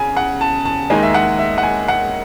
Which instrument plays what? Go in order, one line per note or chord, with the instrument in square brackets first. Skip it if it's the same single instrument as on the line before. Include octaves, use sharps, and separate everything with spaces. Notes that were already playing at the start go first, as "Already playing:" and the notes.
Already playing: [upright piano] C#3 G#5
F#5
A5
A5
D#2 D#3 G#3 D#4 G#5
E5
F#5
E5
F#5
G#5
F#5